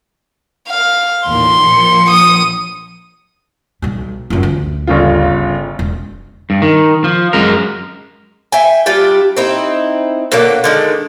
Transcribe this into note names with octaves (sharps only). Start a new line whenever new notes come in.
F5
A1 D#2 A#2 C6
A#1 F3 C#7
D#6
B1 G3
F#2 F4
D2
G1 C#3 F4
E1
G2
D#3
F3
F#2 G#3 A#4
E5 G5 G#5
G3 D4 F4 G4
C4 D#4 E4
B2 D3 F#3 A#3
D3 D#3 G#3